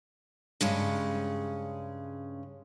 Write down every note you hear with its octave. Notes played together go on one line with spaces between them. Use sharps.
G2 C#3 G#3 C#4